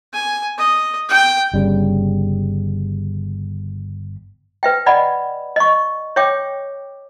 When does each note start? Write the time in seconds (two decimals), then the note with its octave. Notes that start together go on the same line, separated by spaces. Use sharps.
0.13 G#5
0.58 D#5
1.09 G5
1.54 G1 C#3 G3
4.63 B4 E5 G5
4.86 D5 D#5 F#5 B5
5.56 D#5 C#6
6.16 C#5 E5 G5 D6